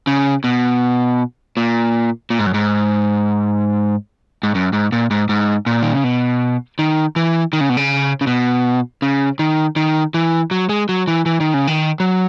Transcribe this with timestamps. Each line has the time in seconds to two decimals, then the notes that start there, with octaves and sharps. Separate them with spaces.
0.07 C#3
0.44 B2
1.57 A#2
2.30 A#2
2.39 G#2
2.46 F#2
2.54 G#2
4.43 G#2
4.55 F#2
4.73 G#2
4.92 A#2
5.11 G#2
5.29 G#2
5.66 A#2
5.82 D#3
5.93 C#3
6.04 B2
6.79 D#3
7.16 E3
7.53 D#3
7.61 C#3
7.69 B2
7.77 C#3
8.21 C#3
8.27 B2
9.02 C#3
9.39 D#3
9.76 D#3
10.14 E3
10.51 F#3
10.69 G#3
10.89 F#3
11.08 E3
11.26 E3
11.40 D#3
11.54 C#3
11.67 D#3
12.00 F#3